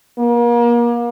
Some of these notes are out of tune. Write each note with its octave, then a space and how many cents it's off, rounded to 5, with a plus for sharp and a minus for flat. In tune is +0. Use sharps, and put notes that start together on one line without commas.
A#3 +35